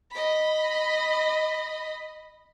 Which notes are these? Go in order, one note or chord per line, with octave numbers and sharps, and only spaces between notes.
D#5 B5